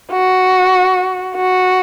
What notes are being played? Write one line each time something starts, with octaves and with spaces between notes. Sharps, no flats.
F#4
F#4